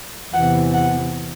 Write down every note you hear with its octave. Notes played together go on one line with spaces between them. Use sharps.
E2 C3 E3 F#5
F#5